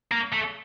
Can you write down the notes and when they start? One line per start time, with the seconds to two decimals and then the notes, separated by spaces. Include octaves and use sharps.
0.11 A#3
0.33 A3